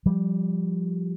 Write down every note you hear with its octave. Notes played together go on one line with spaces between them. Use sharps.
F3 G3